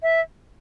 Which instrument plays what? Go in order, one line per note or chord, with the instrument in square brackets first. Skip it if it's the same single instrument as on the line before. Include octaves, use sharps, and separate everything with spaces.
[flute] E5